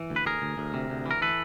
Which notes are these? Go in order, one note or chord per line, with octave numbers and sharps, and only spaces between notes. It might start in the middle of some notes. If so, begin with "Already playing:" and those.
Already playing: E3
D2
B4
D2 G#4 A#4
D2
D2
C3
D2
E3 A#4
E3 A4 B4